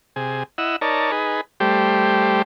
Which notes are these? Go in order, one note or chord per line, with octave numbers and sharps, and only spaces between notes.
C3 G#4
E4 D#5 F#5 E6
D#4 A#4 C#5 D5 A5
D#4 G#4 B4
G3 A3 G4 C5